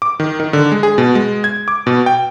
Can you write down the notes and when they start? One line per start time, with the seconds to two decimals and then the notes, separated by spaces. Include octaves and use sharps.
0.02 D6
0.20 D#3
0.40 D#3
0.53 D3
0.72 G#3
0.83 G#4
0.98 B2
1.15 G#3
1.44 G#6
1.68 D6
1.87 B2
2.06 G5